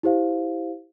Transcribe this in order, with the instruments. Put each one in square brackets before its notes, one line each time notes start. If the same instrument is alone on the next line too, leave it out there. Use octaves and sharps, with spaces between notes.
[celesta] E4 G4 C5 F5